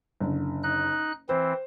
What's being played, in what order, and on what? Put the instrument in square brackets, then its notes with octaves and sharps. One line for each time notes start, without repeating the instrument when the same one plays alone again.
[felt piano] F#1 D3
[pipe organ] D#4 F#6
[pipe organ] E3 C4 [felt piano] C5